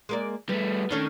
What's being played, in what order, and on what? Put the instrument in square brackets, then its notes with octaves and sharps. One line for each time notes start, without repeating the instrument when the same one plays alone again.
[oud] G#3 A#3 D5
[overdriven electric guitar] G3 A3 [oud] B3
[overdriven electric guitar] D#3 [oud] A3 C#4 D4